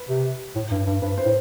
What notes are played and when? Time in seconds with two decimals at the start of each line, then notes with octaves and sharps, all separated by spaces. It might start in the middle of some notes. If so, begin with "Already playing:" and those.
Already playing: B4
0.09 C3
0.55 A2
0.71 G2
0.87 G2
1.02 G2 B4
1.18 C5
1.25 A2